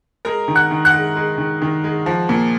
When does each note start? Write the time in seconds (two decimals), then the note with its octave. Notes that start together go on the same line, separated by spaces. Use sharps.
0.25 G#3 A#4 A#5
0.48 D#3
0.55 F#5 F#6
0.71 D#3
0.85 F#5 F#6
0.93 G#3
1.16 G#3
1.38 D#3
1.62 D#3
1.84 G#3
2.06 F3
2.29 A#2